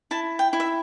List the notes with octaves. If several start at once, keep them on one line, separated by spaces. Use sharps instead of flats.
E4 A5
G5
E4
E5